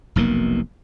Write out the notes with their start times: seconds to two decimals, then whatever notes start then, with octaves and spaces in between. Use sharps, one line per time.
0.16 F1 B1 B2 A#3